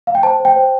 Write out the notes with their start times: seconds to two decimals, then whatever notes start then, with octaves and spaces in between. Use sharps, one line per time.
0.07 F5
0.15 G5
0.23 C5 A5
0.40 C5 G5
0.56 C5